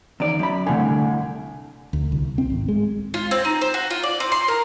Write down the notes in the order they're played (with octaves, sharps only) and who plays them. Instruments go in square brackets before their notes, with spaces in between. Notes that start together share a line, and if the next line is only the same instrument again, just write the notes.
[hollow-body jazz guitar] E2 D#3 D5
F#2 B5
[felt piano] C2 G#5 [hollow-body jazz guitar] A2 D3
[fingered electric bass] D2
C2
C4
G#1
G#3
[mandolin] F4
C4
D#4
C5
F#4
F4
D5
C4
C6
A#4